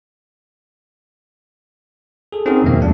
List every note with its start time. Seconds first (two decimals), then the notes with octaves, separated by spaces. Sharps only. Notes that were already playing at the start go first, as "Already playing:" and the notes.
2.32 G#4 A4
2.46 C4 C#4 D#4 F#4 G#4 A#4
2.64 F2 B2 D#3 A#3 E5
2.78 E2 F3 G#3 D4